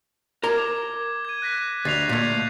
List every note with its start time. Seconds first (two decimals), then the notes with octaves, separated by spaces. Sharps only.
0.43 A#4 A#5 D6 G#6 G7
1.25 G#6 D#7
1.42 F#6 A#6 B6
1.85 D2 A6 C7 F7
2.09 A#2 A3 G6 G#6 B6